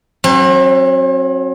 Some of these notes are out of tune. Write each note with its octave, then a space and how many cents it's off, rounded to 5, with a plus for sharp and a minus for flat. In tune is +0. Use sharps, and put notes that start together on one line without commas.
F#3 +0 C4 +40